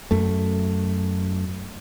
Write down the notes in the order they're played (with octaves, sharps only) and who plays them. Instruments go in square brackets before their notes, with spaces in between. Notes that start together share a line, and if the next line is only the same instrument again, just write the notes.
[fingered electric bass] F#2 A3